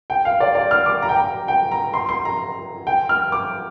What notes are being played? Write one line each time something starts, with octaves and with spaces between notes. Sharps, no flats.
G5
F5
D5
D5
F6
D6
A#5
G5
A#5
G5
A#5
C6
C6
A#5
G5
F6
D6